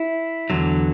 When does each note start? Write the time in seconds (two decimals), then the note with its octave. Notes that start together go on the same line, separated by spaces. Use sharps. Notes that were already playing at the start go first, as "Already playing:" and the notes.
Already playing: E4
0.50 E2 D3 F#3